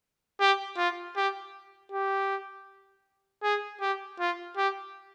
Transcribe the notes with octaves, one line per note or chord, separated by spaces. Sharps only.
G4
F4
G4
G4
G#4
G4
F4
G4